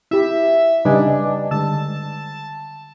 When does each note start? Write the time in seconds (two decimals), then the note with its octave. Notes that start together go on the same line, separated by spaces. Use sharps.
0.11 E4 G4 E5
0.85 C#3 G3 D4 D#4 B4 D#5 G#5
1.51 D3 G3 G#3 A5 E6